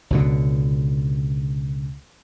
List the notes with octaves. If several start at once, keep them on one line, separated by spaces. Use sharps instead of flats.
C#2 B2 D3